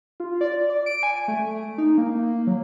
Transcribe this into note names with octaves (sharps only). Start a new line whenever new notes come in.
F4
D5
D5
D7
G#5
A3
D#4
A#3
F#3